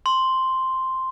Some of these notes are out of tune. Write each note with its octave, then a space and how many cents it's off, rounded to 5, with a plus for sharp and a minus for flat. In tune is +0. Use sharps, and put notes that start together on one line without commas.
C6 +0